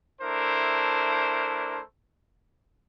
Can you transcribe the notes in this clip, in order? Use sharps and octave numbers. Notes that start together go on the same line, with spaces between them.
A3 D4 E4 A#4 C5